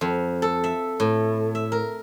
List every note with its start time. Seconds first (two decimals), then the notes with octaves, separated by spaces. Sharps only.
0.01 F2
0.42 A4
0.64 E5
1.00 A2
1.55 E5
1.72 A#4